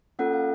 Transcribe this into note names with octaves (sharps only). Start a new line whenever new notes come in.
A#3 C#4 F4 A4 F#5
F5